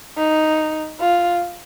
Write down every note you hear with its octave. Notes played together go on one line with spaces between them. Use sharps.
D#4
F4